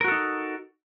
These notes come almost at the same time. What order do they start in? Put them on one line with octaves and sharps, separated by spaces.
A#4 F#4 A4 D#4